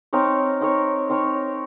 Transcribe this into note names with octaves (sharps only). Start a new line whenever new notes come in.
C4 D#4 A#4 C#5
C4 D#4 A#4 C#5
C4 D#4 A#4 C#5